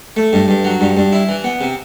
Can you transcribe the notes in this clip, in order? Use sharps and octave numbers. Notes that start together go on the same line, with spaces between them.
A3
G2
G2
F#3
G2
G2
E4
E3
B3
C3